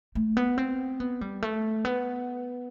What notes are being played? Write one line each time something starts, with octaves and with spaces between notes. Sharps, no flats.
A3
B3
C4
B3
G3
A3
B3